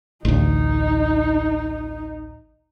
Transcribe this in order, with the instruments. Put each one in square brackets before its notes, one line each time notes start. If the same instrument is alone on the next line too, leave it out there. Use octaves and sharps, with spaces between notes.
[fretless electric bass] A1 D2 [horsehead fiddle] D#4